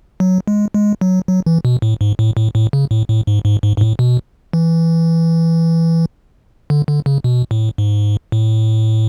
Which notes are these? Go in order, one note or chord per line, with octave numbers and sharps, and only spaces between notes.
F#3
G#3
G#3
F#3
F#3
E3
B2
A2
G#2
A2
A2
A2
C#3
A2
A2
G#2
G#2
G#2
G#2
A2
B2
E3
D3
D3
C#3
B2
A2
G#2
A2